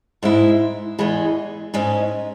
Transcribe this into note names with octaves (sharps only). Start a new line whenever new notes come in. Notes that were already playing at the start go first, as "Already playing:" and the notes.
G#2 G#3 E4
E2 E3 G#3
G#2 G#3 C#4